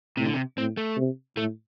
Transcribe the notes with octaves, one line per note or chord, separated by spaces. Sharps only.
A2 C3
D3
C3
A2 C4
A3
C3
A2 A3